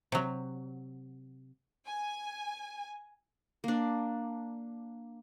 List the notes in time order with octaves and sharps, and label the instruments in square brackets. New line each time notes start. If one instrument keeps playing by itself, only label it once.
[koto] C3 F#3
[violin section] G#5
[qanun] A#3 D4